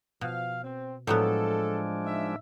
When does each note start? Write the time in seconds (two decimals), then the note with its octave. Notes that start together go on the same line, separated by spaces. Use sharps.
0.21 B2 F3 F5
0.63 C4
1.07 A2 F3 F#3 G#3 B3 D4 A4
2.05 D#4 E5